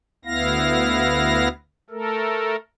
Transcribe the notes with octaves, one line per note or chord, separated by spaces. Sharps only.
D2 B3 E4 F5 A#6
A3 A4 A#4